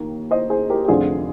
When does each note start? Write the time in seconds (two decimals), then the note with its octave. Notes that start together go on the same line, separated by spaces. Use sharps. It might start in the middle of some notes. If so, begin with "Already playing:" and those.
Already playing: D#2 D#3 A#3
0.31 C5 D#5
0.50 G#4 C5
0.70 G4 A#4
0.85 G4
0.88 F1 F2 D3 G3 C4 F4 G#4